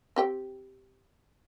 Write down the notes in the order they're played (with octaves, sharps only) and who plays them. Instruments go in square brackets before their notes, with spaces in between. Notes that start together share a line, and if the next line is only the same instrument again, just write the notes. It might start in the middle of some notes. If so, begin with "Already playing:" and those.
[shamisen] C4 G4 G5